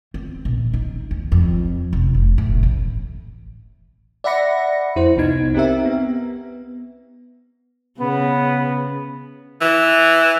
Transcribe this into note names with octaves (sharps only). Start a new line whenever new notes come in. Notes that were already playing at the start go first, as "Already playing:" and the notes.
C4
A#1
D#4
D#2
F2
F1
F1
A2
A1
D5 E5 F#5 B5 A#6 C#7
F2 E4 C5
C2 C3 B3 D#4 G#6
C4 D#4 G4 A#4 E5
B3
C#3 B3
E3